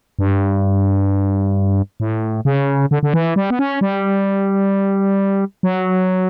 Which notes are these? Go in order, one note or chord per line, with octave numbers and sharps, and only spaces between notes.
G2
A2
C#3
D3
D3
E3
G3
B3
C#4
G3
F#3